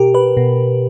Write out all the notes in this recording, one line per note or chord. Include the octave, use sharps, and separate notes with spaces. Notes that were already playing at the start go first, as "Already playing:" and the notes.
Already playing: B2 G4 A#4
B4
B2